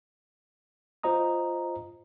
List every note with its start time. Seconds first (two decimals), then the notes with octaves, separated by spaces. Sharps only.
1.03 F4 C5 D#5 A#5 D#6